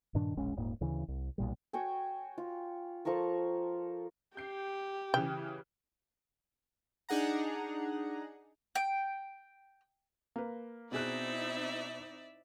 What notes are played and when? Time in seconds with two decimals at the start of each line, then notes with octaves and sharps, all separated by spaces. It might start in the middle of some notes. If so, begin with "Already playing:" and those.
0.15 G2 A#2 D#3 D4
0.37 E1 A#1 G#3 C#4
0.56 D#1 G#2 A#3
0.81 D2 C#3 E3
1.08 C2
1.38 B1 A#2 G3
1.73 F#4 C#5 G5 G#5
2.38 F4
3.05 F3 A4 A#4 C#6
4.37 G4 G6 C7
5.14 C#3 E3 G5
7.09 D4 D#4 G#4 F#5 A#5
8.75 G5
10.36 A#3 B4
10.92 B2 C4 D#4 E4 G#4 D5 E5 F#6